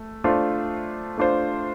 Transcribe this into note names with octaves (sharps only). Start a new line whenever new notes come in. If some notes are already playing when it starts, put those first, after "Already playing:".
Already playing: A3
A3 D4 F4 C5
A3 D4 F4 C5